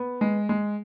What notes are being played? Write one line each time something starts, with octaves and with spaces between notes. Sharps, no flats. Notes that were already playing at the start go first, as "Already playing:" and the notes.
Already playing: B3
G#3
G#3